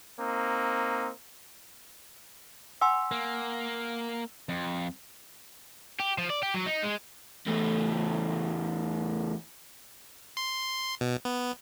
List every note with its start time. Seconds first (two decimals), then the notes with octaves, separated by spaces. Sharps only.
0.19 A#3 C4 D#4
2.81 F#5 G#5 C6 E6
3.11 A#3
4.49 F2
6.00 G4
6.18 F3
6.30 D5
6.43 G4
6.54 F#3
6.66 D#4
6.83 G#3
7.47 E2 A3
10.37 C6
11.01 B2
11.25 B3